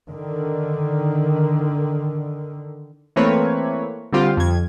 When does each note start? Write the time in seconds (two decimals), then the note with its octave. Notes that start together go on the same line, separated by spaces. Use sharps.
0.10 D3 D#3
3.16 E3 A3 A#3 C4 B4 C#5
4.13 D3 G3 C4 F4 G4
4.37 F2 G#6